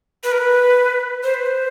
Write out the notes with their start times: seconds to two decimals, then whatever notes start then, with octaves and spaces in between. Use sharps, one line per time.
0.23 B4
0.32 A#4
0.38 B4
1.23 C5
1.34 B4
1.46 C5